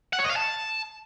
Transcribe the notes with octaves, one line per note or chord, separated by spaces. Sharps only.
F#5
C#5
D#5
F5
A5